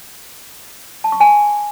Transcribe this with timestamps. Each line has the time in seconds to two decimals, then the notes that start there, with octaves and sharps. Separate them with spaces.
1.04 A5
1.12 C#6
1.20 G#5